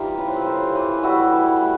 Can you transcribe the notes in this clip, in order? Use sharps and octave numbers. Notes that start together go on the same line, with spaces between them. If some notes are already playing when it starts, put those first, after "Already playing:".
Already playing: E3 G3 D#4 F4 G4
C#3 B4
C5
A4 B4
C#3 A#4 C5
E3 A4 B4
G3 E4 F#4
E3
A3